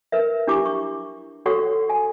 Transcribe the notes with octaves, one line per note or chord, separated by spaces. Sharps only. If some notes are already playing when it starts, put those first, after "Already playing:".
A#4 B4 E5
D4 E4 G4 C#6 D6
C#6
F#4 A4 C#5 F#5 C#6
G#5